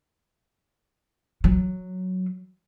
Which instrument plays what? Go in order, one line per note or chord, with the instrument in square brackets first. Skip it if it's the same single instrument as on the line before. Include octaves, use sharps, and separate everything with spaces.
[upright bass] F#3